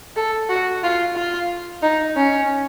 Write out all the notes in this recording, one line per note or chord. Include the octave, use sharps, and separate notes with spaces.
A4
F#4
F4
F4
D#4
C#4